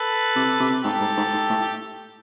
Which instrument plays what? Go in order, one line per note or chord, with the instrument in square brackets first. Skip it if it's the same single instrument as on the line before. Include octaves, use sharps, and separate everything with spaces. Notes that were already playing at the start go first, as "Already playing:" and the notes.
Already playing: [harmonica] A4 B4
[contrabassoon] C3
C3
[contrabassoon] G#2 [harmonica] G4 A4
[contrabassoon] G#2
G#2
G#2
A2